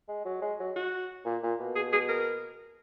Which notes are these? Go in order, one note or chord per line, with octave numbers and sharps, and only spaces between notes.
G#3
F#3
G#3
F#3
F#4
A#2
A#2
B2
G#4
G#4
A#4